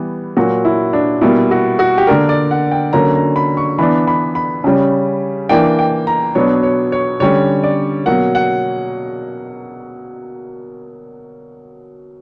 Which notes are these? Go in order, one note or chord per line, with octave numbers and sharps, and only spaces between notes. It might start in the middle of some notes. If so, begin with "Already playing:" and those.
Already playing: E3 G3 B3
A#2 F#3 A#3 F#4
E4
D4
B2 G3 A#3 E4
F#4
F#4
G4
D3 A#3 D4 A#4
D5
F#5
G5
D3 F#3 A#3 C#4 A#5
A#5
B5
C#6
E3 B3 D4 B5
B5
B5
C#3 G3 C#4
E3 A#3 D4 G5
G5
A#5
B2 F#3 B3 D4 C#5
C#5
C#5
D3 G3 C#4 C#5
D5
B2 F#3 A#3 F#5
F#5